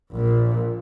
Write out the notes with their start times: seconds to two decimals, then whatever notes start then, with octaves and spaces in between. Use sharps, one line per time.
0.12 A#1 A#2